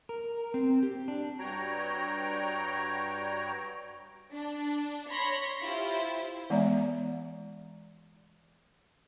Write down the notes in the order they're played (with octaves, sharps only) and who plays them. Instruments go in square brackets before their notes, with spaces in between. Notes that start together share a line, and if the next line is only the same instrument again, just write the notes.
[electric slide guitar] A#4
C4
G4
D4
[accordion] G2 G3 F#4 C#5 G5 A#5
[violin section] D4
C#5 B5 C6 A#6
E4 F4 G4 C5
[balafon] E3 G#3 B3 D5 E5 A#5